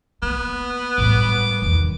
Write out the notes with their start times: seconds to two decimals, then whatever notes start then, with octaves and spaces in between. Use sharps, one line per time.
0.23 A#3 B3
0.98 A2 G3 D6
1.62 E2 D#3